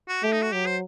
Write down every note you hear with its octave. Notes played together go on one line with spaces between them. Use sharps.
F#4
A3 G4
D#4
F#4
F#3 G4
C5